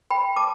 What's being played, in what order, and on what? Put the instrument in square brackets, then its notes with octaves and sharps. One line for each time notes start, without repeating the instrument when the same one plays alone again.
[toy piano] G5 B5
A5 D6